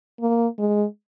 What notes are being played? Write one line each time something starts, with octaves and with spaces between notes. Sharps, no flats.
A#3
G#3